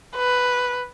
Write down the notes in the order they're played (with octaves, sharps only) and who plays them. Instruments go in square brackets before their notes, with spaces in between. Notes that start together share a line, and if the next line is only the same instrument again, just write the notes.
[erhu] B4